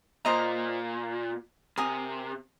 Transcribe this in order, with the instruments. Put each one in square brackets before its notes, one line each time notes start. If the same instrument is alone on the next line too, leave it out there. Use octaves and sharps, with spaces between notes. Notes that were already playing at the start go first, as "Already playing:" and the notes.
[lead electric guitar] A#2 [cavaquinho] C5 D#5 A#5 D#6
[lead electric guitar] C3 [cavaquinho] A#4 G#5 D#6